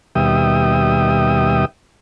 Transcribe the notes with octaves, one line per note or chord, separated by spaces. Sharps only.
D#2 B2 G3 E5 G5 D#6